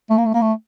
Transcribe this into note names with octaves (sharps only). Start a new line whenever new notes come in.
A3
A#3
A3
A#3
A3